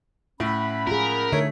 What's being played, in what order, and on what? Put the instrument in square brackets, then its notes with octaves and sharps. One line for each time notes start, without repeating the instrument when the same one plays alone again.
[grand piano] A2 [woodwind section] C#4 F#5 B5 [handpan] E5
[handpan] F4 G#4 [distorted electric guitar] A#4
[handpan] D3 [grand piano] A3 [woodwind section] D#4 C#5